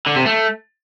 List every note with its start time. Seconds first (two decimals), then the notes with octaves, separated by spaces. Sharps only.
0.06 D3
0.16 C3
0.26 A3